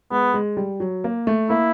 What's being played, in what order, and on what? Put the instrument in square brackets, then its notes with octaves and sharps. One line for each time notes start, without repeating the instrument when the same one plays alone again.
[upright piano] G#3 [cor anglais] B3
[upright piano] G#3
G3
F#3
A#3
A3
[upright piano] A#3 [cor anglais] E4